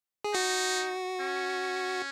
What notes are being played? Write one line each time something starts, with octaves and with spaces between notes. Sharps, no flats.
G#4
D#4 F#4
C#4